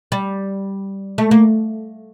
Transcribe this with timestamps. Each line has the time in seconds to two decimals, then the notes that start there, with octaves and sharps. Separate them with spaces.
0.12 G3
1.18 A3
1.31 A#3